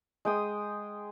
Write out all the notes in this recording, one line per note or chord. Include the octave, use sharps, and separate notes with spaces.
G#3 G5 D#6